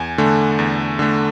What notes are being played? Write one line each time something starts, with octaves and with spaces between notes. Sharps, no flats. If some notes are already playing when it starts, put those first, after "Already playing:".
Already playing: E2 G#5
D3 A3
E2
D3 A3